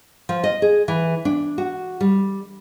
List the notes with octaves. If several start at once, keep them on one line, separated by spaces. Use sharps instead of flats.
F3
D#5
G#4
E3
D4
F#4
G3